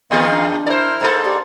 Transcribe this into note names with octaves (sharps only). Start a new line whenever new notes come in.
E2 D#3 B3 G#4 D#5 F5 C6
D4
E4 A#4 C5 D5 F6
G#2 A#3 A4 C5
G4 D5